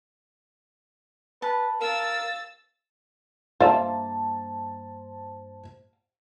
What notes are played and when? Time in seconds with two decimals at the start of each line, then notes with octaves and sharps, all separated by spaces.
1.42 B4 A5
1.81 A#4 F5 E6 A6
3.60 G2 A#3 F4 C5 E5 A5